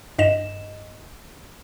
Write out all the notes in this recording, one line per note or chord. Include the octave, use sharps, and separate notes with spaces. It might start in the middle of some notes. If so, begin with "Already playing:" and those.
G2 D#5 E7